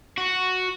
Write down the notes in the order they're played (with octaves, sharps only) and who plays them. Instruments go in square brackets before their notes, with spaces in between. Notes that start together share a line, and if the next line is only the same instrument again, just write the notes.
[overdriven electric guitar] F#4